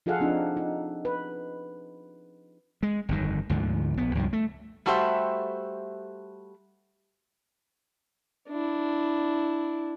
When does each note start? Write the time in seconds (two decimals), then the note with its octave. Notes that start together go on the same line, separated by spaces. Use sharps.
0.06 F3 F4 G#4 A4 F5 F#5
0.20 F3 C4 D4 D#4
0.57 D#4
1.05 B4
2.83 G#3
3.09 G1 F2 D#3
3.50 D2 G#2 D3 F3
3.97 A#1 B3
4.15 C#2 G2 F3
4.33 A3
4.86 G3 A3 F#4 G4 C5 E5
8.49 D4 E4